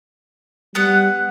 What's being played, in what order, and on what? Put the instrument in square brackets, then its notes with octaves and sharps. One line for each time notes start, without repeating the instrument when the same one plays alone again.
[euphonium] G3 [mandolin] B3 F#5